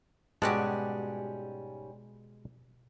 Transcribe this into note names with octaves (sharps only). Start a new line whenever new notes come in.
G#2 B2 G3 G#3 C#4 F#4 G4 A5